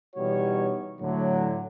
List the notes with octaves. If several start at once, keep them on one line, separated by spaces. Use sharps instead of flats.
B2 E3 G3 D#4 F#4 C#5
A2 D3 F#3